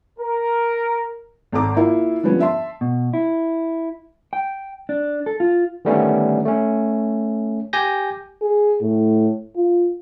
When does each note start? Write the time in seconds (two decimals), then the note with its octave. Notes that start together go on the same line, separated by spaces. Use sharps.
0.19 A#4
1.52 G#1 A4 A#5 D6
1.77 A#3 E4 F4
2.23 D3 F3 G3 B3 C#4
2.40 E5 A5 C6
2.81 B2
3.13 E4
4.33 G5
4.89 D4
5.26 A4
5.40 F4
5.85 D3 D#3 G3 A3 B3 C#4
6.45 A3 C#4
7.73 G4 G#5 G6 A#6
8.42 G#4
8.81 A2
9.56 F4